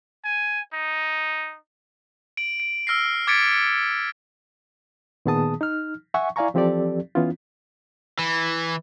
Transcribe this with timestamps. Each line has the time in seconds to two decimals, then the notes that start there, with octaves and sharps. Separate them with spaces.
0.25 G#5
0.73 D#4
2.37 D7 F#7
2.60 D7
2.87 E6 F6 A#6 C7
3.27 D6 G#6 A6 B6 C#7 D7
3.52 G#6 C#7
5.26 A#2 D#3 B3 G#4 A5 D#6
5.61 D#4 F6
6.14 E5 F#5 G#5 C#6
6.36 E4 D5 F5 G#5 A#5 C#6
6.54 E3 F3 C4 G4 A4 D5
7.15 E3 B3 C#4 E4 F4
8.19 E3